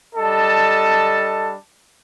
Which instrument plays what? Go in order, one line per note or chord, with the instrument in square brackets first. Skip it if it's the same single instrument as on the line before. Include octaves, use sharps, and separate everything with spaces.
[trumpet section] G3 D4 A4 D#5 A5